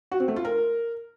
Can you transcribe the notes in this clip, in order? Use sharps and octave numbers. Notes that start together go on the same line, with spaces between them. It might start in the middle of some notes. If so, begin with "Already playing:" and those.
F#4
C4
A3
F4
A#4